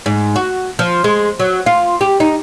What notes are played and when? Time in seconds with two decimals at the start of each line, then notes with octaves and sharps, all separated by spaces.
0.06 G#2
0.36 F#4
0.79 F3
1.04 G#3
1.40 F#3
1.66 F4
2.01 G4
2.20 D#4